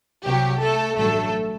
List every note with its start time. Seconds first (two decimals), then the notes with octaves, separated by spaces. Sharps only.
0.24 C2 C3 F#3 G4
0.60 A3 A4
0.96 A1 G2 D3 F#3 A3 A4